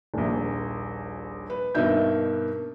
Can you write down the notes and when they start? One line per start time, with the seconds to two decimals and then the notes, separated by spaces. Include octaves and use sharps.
0.14 D#1 A#1
1.50 B4
1.75 G2 B2 A#3 D#4 E5 G6